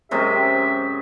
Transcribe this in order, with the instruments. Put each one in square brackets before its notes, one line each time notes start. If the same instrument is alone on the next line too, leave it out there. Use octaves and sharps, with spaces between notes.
[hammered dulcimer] F#2 C3 G#3 [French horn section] G4 C5 [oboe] E5